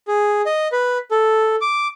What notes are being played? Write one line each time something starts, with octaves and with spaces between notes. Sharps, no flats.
G#4
D#5
B4
A4
D6